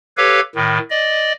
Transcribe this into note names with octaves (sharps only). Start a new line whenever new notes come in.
G4 A4 B4 C#5 F5
A2 D#3
D5 D#5